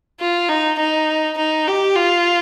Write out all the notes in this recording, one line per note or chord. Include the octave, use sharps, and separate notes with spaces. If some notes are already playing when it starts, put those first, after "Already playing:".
F4
D#4
D#4
D#4
G4
F4